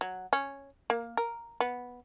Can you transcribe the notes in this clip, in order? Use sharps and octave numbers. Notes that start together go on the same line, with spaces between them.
F#3
C#4
A#3
A#4
B3